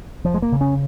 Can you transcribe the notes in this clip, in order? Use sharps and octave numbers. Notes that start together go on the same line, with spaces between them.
F1 F3
G#3
A#3
C#3
C#4